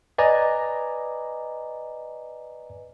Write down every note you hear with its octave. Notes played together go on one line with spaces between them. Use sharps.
B4 D5 D#5 G#5 A#5